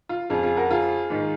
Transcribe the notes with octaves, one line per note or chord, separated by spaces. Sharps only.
F4
F2 C#3 F4 G#4
F4 G#4
F#4 A#4
F4 G#4
G#2 D#3